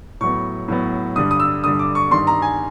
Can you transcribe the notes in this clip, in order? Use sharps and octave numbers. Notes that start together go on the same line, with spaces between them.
A2 F#3 B3 C#6
A2 F#3 B3
G2 D3 G3 D#6
D#6
E6
G2 D3 G3 D#6
D6
C#6
G2 D#3 G3 C6
A#5
G#5